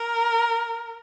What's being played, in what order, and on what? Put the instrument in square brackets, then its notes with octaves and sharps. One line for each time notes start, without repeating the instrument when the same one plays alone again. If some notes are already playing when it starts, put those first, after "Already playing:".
Already playing: [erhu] A#4